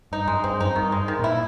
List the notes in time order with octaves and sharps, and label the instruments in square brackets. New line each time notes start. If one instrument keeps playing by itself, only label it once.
[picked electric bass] G2 [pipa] D#4
[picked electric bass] F#2 [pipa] G#3
[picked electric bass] G2 [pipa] C4
[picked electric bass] F#2 [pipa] D#4
[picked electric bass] G2 [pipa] D#3
[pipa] G#3
D#3
[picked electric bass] A#2 [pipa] E4